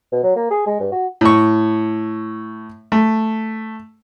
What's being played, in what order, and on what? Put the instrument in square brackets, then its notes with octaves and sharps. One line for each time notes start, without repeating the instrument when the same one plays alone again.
[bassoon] B2
F#3
A#3
G#4
G#3
G2
F#4
[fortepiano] A2 C#6
A3